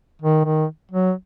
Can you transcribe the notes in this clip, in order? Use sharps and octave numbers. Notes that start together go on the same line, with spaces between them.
D#3
D#3
F#3